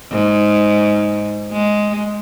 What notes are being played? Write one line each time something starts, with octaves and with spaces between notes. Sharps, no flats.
G#2
G#3